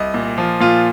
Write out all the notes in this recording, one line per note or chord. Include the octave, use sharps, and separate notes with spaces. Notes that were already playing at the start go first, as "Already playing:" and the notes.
Already playing: C2 D#5
A#2
F3
A#2 F4